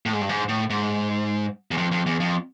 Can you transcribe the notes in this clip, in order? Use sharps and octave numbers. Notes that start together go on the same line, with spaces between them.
A2
G#2
G2
G#2
A2
G#2
E2
F2
F2
E2
F2